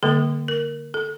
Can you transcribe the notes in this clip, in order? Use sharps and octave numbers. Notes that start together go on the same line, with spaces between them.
D3 G3 A#3 A4
A#4
A4